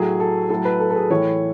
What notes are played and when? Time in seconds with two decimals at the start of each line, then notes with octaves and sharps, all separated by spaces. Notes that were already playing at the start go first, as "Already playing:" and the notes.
Already playing: A2 F#3 G#4
0.20 A4
0.50 A2 F#3 A4
0.65 B4
0.80 A4
0.90 A4
0.95 G#4
1.10 A2 E3 C#5